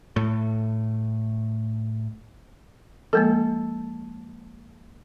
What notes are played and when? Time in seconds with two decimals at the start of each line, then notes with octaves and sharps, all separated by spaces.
0.16 A2 A3
3.13 F3 G#3 A#3 A4